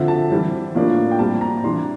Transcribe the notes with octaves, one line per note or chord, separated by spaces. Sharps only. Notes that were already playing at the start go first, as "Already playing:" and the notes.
Already playing: D3 F3 C4 E5
A5
E3 G3 C4
A2 F3 A#3 D4
G5
A#2 G3 C4 A5
A#5
C3 E3 G3 D4 C6